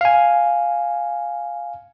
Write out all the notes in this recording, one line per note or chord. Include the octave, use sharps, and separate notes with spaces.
F5 G#5